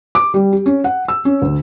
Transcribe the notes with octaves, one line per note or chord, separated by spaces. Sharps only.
D6
G3
G4
C#4
F#5
E6
C#4
D2